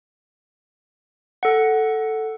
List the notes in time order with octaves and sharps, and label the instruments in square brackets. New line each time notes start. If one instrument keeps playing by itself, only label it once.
[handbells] A4 F#5